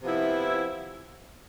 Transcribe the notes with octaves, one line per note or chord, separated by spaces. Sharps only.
C3 F3 B3 E4